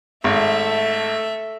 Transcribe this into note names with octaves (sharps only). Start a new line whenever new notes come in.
G#1 A3 E5